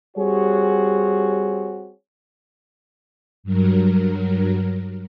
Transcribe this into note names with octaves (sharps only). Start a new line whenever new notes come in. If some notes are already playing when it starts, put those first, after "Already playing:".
G3 C4 F#4 G#4 C#5
G2 F#3 A#4